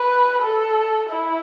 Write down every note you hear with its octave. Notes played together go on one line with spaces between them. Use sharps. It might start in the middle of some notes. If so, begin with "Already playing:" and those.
Already playing: B4
A4
E4